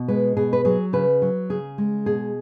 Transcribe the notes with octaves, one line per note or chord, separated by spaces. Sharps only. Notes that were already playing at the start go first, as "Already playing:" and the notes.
Already playing: B2
G#3 B4
B2 G#4
B4
F#3 G#4
C#3 B4
F#3
C#3 G#4
G#3
B2 G#4